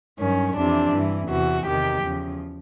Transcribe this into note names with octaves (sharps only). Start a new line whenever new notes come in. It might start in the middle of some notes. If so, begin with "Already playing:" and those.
G2 D#3 F#3 C#4
F2 C3 E3 D4
G2 E3
E2 C3 E3 F#4
E2 C3 D#3 G4
E2 C#3 F3